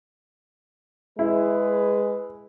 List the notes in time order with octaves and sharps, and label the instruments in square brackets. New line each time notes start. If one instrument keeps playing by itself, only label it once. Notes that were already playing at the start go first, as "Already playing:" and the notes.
[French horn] G#3 [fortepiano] E4 [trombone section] G#4 B4